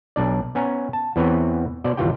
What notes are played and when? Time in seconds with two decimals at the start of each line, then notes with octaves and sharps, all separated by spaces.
0.16 B1 D4 D5
0.55 B3 C#4 G#5 A#5
0.93 A5
1.16 E2 E3 B3 C4 B4 C#5
1.84 B2 C5 D5
1.97 G#1 C#2 E3 F4 G4 G5